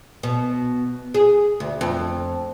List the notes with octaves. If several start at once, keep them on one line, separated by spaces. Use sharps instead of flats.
B2
G#4
D2
F2